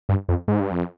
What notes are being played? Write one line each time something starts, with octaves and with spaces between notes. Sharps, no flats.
G2
F2
G#2
G2
F2